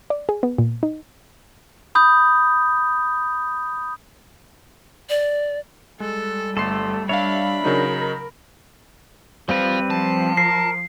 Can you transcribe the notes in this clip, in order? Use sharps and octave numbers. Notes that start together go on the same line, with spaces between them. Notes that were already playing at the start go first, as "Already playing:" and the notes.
D5
G#4
B3
A#2
D#4
B5 D#6 G6
D5
G3 G#3 A4
G1 A3 A4 C6 C7
D4 C#5 E5 F5 B5
C#3 F#3 D#4 A#4
G3 C4 B4 C5 F5
F3 A5
A#4 C7